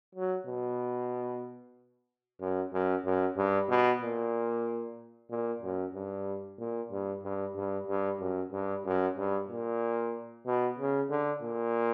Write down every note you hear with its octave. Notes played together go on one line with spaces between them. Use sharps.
F#3
B2
F#2
F#2
F#2
G2
B2
A#2
A#2
F#2
G2
A#2
G2
G2
G2
G2
F#2
G2
F#2
G2
A#2
B2
C#3
D3
A#2